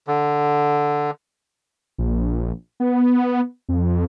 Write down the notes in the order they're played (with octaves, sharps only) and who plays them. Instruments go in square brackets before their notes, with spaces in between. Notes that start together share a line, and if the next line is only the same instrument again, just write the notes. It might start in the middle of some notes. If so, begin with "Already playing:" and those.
[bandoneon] D3
[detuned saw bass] A#1
B3
F2